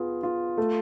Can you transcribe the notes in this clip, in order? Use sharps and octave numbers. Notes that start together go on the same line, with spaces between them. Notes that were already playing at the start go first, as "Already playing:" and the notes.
Already playing: B3 F4 G#4
F4
A3